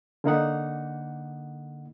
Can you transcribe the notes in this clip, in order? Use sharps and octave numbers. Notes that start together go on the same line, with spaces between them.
D3 A#3 D#4 F#5